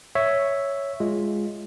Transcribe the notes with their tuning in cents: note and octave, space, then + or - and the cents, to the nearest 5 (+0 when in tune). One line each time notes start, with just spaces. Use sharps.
C#5 +0 E5 +0
G#3 +0 F4 +0